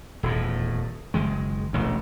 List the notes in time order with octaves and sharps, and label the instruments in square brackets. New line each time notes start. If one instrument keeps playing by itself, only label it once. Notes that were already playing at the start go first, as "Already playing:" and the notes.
[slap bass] D#1 E2 A2
F#1 D#3 G#3
E1 A1 D2